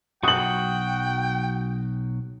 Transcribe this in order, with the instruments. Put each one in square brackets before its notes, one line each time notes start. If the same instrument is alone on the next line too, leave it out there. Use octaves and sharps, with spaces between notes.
[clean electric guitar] B1 F#3 F#4 [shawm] G5 [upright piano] D#6 F#7